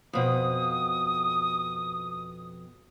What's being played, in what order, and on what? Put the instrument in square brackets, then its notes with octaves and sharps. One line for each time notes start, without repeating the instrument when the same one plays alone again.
[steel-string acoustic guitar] F2 B2 [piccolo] D#6